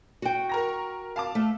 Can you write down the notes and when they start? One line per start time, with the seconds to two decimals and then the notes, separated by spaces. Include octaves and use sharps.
0.22 F#4 G5
0.49 A#4 A#5 A#6
1.16 F5 A5 D6
1.35 A3